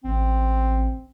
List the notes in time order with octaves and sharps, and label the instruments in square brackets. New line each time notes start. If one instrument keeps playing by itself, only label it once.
[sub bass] A1 [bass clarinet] C4